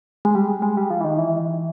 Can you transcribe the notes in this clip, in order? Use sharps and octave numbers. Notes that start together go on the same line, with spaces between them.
G#3
G3
G#3
G3
F3
E3
D#3
E3